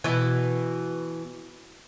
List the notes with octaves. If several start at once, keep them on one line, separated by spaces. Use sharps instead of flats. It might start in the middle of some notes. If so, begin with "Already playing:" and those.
B2 E3